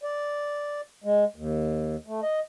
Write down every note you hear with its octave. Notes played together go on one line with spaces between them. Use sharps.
D5
G#3
D#2
A3
D#5